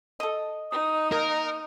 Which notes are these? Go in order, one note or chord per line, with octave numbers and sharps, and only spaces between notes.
A4 D#5
D#4 D#6
A#3 A#4 D#6